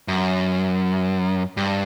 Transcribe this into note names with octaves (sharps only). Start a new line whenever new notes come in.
F#2
G2